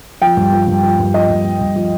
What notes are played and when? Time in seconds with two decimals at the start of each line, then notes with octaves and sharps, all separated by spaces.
0.22 F3 G5
0.37 G2
0.52 F3
0.68 G2
0.83 F3
0.99 G2
1.14 F3 D#5
1.30 G2
1.44 F3
1.61 G2
1.76 F3